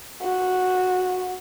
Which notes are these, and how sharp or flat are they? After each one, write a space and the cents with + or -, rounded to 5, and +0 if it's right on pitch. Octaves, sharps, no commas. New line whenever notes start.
F#4 -10